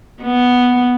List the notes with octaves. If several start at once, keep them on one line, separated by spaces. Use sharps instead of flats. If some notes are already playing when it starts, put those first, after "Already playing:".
B3